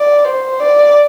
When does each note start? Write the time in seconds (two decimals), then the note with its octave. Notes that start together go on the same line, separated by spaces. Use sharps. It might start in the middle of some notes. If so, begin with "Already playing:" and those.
Already playing: D5
0.25 C5
0.60 D5